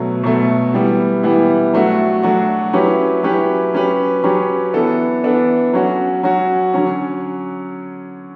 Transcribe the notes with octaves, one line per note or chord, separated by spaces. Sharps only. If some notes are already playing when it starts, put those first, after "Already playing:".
Already playing: B2 F#3 A3
B2 F#3 A3
E3 G3 B3 E4
E3 G3 B3 E4
F#3 A3 D4 F#4
F#3 A3 D4 F#4
F#3 C#4 E4 G4 B4
F#3 C#4 E4 G4 B4
F#3 C#4 G4 B4
F#3 C#4 G4 B4
E3 B3 D4 A4
E3 B3 D4 A4
F#3 C#4 F#4
F#3 C#4 F#4
D3 F#3 C#4